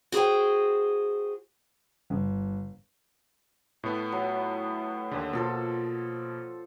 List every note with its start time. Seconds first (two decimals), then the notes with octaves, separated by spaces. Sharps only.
0.12 F#4 G#4 A#4 C5 G5
2.10 G1
3.83 A2 A3 B3
4.12 F#3
5.11 D#2 D3
5.33 B2 F3 A#3 A4 C5